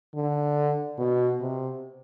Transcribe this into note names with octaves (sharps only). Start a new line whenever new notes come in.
D3
B2
C3